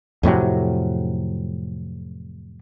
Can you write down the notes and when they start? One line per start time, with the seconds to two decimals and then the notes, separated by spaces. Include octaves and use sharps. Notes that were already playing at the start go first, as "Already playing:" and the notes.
0.23 F2 A2 C3 F#3